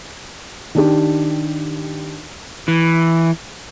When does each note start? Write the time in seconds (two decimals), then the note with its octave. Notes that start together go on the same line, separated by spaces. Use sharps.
0.75 D#3 D4 G4
2.68 E3